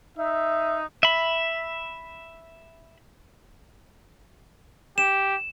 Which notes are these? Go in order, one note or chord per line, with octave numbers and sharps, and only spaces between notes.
D#4 E5
E5 B5
G4 E7